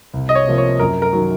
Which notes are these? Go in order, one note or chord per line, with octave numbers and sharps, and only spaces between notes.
C2
D#5
C#5
C3 F3 A#3
C#5
F#2 A#4
A#4
D#3 F#3